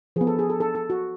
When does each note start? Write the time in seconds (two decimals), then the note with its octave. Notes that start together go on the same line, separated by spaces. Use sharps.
0.16 F3 G#4
0.21 B3
0.27 A4
0.39 G#4
0.50 A4
0.60 A4
0.75 A4
0.90 F#4